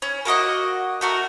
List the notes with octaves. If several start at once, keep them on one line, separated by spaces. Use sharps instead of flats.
C#4
A#3 F#4 D#5 F#5
A3 F#4 A#4